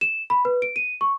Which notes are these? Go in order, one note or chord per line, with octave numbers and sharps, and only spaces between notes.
E7
B5
B4
D7
D#7
C#6